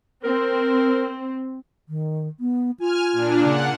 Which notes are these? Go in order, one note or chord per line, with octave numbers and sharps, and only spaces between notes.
C4 A#4
D#3
B3
F4 G#5 F6
A#2 D4
C#3 F#5